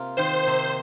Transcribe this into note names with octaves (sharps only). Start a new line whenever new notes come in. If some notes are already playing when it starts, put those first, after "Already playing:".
Already playing: C3 A#3 F4
D#3 C5
C3